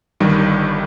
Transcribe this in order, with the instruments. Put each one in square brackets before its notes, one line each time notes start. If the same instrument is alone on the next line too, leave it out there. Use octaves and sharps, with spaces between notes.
[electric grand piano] G1 G2 D#3 G3